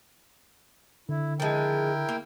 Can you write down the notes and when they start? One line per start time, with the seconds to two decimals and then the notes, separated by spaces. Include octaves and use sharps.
1.09 D3 E4
1.40 F3 G#3 E4 A#4 G5
2.09 A#3